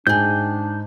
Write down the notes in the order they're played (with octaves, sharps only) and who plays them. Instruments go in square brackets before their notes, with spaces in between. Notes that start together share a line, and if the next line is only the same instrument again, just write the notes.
[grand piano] G#2 [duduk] D4 [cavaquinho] G#4 G5 [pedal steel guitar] G6